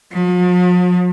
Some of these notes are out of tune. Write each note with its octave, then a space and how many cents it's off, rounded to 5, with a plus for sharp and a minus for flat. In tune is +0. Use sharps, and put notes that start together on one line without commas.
F3 +45